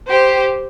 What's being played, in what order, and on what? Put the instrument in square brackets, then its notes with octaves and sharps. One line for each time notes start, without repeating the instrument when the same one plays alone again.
[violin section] G4 C5